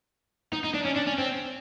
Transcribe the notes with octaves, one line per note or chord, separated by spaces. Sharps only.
D#4
D#4
D4
C#4
D4
C#4
C4